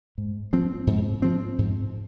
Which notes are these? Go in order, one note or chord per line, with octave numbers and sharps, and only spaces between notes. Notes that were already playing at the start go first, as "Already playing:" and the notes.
G#2
F3 C4
G#2
F3 C4
G#2